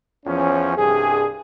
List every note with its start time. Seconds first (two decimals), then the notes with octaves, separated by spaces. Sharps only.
0.26 E2 F3 C#4
0.76 C2 G2 G#4